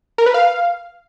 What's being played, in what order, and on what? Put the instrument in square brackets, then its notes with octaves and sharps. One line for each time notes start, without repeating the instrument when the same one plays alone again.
[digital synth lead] A#4
B4
F5